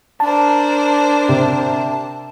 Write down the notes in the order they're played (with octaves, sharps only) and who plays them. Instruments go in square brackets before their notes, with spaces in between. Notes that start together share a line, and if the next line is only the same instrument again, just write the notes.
[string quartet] D4 A#4 C5 [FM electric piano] A5
[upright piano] C3